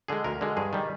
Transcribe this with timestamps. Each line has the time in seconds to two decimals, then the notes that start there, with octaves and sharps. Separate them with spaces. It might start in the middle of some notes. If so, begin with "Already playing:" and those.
0.08 D3 G#3 G#4
0.24 D2 A#4
0.41 D3 G#3
0.57 G2 G#4
0.73 D#3 G3